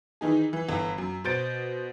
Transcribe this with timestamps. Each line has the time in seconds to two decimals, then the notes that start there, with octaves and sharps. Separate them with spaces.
0.21 D#3 E3 D#4 G#4
0.53 E3
0.69 G1 E3
0.98 F#2
1.24 B2 C5 G6 A6 D7